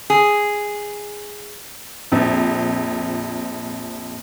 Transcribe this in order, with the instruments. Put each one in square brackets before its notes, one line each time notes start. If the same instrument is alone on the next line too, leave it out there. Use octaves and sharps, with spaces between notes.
[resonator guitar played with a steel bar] G#4
[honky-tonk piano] A#1 F2